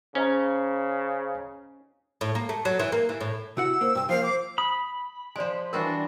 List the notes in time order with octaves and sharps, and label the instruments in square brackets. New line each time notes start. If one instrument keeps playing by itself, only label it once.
[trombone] C#3 [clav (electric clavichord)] C#4 [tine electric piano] C5 D#5 A#5
[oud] A2
A#3
A3
F#3
E3
A#3
E3
A2
[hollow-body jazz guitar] C3 F#4 F#5 [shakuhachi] E4 [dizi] E6
[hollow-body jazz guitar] A#3 [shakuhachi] C5
[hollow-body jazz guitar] C2 G2 [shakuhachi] G5
[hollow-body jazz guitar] F3 A#3 [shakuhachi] C5 [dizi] F5
[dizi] D6
[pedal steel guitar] B5 [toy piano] D#6
[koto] F3 G#3 [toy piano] D5 G#5
[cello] E3 D4 [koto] G3 F4 F#4 [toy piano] A#4 B4 F#5